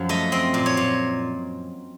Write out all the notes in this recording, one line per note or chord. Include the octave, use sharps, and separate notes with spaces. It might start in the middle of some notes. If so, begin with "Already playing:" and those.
Already playing: F#2 F3
A3 D#5
C4 D#5
A#2
C#5
A#2